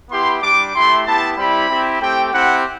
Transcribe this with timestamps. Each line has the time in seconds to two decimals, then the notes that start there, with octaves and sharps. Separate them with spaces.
0.10 B3 E4 G4 C6
0.42 G3 D4 G4 D6
0.75 A3 E4 G4 C6
1.07 B3 E4 G4 A5
1.38 G3 C4 E4 G4 B5
1.70 C4 E4 G4
2.01 A3 C4 G4 G5
2.33 C4 E4 G4 F#5